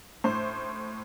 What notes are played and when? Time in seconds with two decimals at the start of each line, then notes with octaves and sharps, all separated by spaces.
0.24 A2 C5